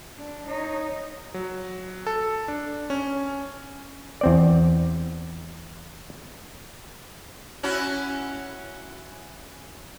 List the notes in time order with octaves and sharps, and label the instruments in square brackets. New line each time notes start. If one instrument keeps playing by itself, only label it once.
[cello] D4
D#4 C#5
[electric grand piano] F#3
A4
D4
C#4
[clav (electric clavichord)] E2 C4 D5
[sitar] C#4 E4 F#4